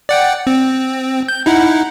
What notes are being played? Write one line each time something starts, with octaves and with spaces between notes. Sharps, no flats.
D5 F#5 G5
C4
G6
D#4 E4 F#5